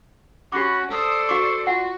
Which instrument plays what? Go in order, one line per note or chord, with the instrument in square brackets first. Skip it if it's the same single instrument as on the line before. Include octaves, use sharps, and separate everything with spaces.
[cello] C#4 [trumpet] F#4 [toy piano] G4 D6 [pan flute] B5
[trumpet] A4 [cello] C5 D5 [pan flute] D#6
[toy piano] F#4 D6 [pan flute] C#6
[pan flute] F4 [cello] F#4 [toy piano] F#5